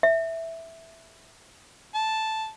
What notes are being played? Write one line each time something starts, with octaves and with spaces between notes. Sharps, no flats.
E5
A5